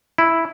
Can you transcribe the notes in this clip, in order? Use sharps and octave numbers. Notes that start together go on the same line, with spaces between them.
E4